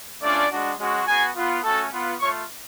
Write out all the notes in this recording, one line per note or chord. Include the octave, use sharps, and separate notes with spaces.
A3 C#4 D4 F4 D5
G#3 D4 F#4
G#3 C#4 F#4
B3 F#4 G#4 G#5
B3 F4
A3 C#4 F#4 A4 A5
B3 F4
A3 F4 C#5 C#6